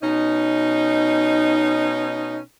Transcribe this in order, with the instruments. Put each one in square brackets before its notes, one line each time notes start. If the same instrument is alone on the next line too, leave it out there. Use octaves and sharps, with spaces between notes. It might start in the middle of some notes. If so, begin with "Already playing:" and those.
[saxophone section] B2 C#4 D#4